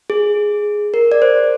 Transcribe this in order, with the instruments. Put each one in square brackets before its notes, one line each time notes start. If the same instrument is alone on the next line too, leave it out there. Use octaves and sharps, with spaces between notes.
[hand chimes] G#4
A#4
D5
C5